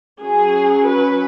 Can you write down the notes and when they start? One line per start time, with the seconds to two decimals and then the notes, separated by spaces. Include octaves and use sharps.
0.21 F#3 C#4 G#4
0.87 B4